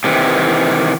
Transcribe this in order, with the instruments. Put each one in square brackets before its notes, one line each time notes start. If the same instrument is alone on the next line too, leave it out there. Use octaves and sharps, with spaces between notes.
[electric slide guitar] C3 D#3 E3